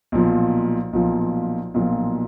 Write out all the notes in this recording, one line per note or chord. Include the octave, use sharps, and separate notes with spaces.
B1 A#2 F3
B1 A#2 F3
B1 A#2 F3